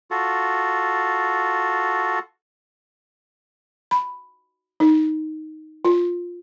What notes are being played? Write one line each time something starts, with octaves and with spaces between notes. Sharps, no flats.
F4 F#4 A4
B5
D#4
F4